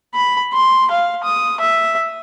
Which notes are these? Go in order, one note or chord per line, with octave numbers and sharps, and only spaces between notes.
B5
C6
F5
D#6
E5